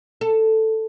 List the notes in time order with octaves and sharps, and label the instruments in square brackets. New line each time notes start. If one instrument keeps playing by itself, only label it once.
[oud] A4